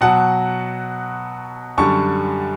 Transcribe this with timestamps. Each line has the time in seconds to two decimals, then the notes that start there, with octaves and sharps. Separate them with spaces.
0.01 B2 F#3 F#5 A5
1.77 F#2 D3 G3 A5 C#6